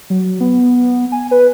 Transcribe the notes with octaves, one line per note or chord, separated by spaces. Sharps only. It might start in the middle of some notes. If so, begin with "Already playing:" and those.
F#3
B3
G#5
B4